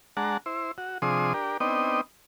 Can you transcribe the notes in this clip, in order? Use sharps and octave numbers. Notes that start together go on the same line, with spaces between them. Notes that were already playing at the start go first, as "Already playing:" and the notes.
G#3 D4 F#5 A5 A#5
E4 C5
F#4
C3 F3 D4 G#4 C6 D#6
D4 G4 A#4
B3 C4 D4 D#4 D#5 G5